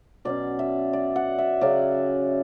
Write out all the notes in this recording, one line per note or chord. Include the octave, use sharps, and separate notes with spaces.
B2 F#3 C#4 D5
E5
D5
F#5
E5
C#3 F#3 C#4 D5